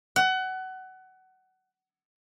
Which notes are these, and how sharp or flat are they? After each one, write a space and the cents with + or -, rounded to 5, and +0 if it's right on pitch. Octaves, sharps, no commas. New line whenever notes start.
F#5 +25